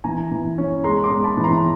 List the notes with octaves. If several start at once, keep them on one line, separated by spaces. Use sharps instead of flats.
E3 G#5 A#5
E3
C#4
G#3 A#5 C6
C6 D6
G#3
A5 B5
E3
A#5 C6